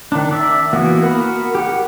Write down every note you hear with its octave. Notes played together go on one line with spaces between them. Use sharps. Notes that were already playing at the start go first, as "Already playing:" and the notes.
D#3 D4
D5 E5
E3 A#3 B3 F#4
F#4 A#4 F#5 B5
G4 F#5